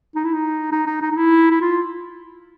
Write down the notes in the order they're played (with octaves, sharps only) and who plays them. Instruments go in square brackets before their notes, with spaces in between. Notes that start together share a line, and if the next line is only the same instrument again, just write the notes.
[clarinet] D#4
E4
D#4
D#4
D#4
D#4
D#4
E4
E4
F4